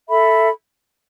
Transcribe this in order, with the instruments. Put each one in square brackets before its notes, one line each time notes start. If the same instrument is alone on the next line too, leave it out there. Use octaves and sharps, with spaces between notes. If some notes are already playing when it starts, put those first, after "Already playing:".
[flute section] A4 E5 B5